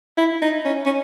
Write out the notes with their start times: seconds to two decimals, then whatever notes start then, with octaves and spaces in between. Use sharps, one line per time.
0.17 E4
0.42 D#4
0.65 C#4
0.85 C#4